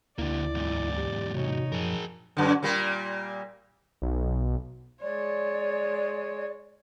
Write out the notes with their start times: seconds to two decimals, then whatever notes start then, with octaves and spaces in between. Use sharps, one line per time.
0.18 D2 D3 A#3 E4 D5
0.55 E2 G#2
0.97 G4
1.35 C3 D#4 F#4 C#5
1.72 F#2 A#2 F3 G#4 A#4
2.37 F#2 D3
2.63 A#2 G3 A#3
4.02 B1
5.02 G#3 C#5 D5